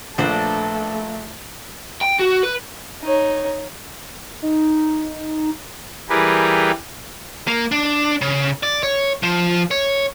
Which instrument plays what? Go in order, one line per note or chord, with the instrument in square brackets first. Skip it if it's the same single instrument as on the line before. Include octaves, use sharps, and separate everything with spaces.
[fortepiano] A#1 [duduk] A3 [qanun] D4 B4 C5 [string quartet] A4
[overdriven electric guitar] G5
F#4
B4
[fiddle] D#4 C#5
[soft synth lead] D#4
[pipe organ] E3 G3 G4 G#4 A#4 B4
[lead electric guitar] A#3
D4
C#3
D5
C#5
F3
C#5